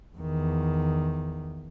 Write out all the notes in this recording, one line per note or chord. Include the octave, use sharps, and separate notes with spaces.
E2 D#3